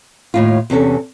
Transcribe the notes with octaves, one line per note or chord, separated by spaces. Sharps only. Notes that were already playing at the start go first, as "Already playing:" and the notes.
D#2 A2 F4
E2 C3 C#4 A4